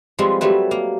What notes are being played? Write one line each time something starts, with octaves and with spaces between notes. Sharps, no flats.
F3 G3 G#3 C4 B4
F#3 G3 A3 B4
A#3